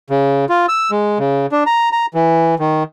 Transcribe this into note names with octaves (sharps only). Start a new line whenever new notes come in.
C#3
F4
E6
G#3
C#3
D4
A#5
A#5
E3
D#3